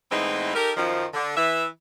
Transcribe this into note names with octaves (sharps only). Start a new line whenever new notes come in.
A2 E3 G#3 B3 C4 D#4
D#4 G4 A4 A#4
F#2 D#3 F3
D3
E3 E5